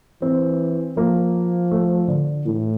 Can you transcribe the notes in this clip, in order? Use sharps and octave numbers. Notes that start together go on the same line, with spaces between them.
E3 C4
F3 A#3
A3
D3
A2 E3